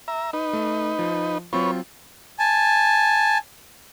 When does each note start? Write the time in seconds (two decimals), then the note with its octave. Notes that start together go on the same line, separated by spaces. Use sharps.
0.08 E5 A#5
0.33 D#4 B4
0.53 A3
0.99 F3
1.53 F#3 C4 F4 B4 C#5
2.39 G#5 A5